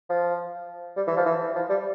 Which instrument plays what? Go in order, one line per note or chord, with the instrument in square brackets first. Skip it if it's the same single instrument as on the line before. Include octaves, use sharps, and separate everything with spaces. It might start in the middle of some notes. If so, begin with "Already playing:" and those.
[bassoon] F3
G3
E3
F3
E3
F3
G3